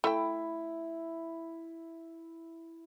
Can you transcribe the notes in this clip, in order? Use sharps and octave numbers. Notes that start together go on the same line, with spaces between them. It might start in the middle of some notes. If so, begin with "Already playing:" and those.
A3 E4 E5 G5